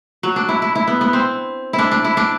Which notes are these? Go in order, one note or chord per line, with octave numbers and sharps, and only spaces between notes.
F#3
D4
E4
E4
E4
B3
B3
C4
E4
D4
D4
E4
D4